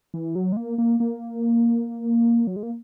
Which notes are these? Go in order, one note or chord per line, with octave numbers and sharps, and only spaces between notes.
E3
F#3
G#3
A#3
A#3
A#3
F#3
G#3
A#3